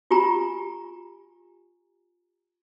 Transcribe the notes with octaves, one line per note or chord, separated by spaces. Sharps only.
F4 G4 G#5 A#5